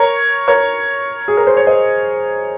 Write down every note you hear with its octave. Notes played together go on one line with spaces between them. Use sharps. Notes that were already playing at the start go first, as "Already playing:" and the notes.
Already playing: A#4 C#5
A#4 C#5
G#4
A#4
C5
C#5
C5 D#5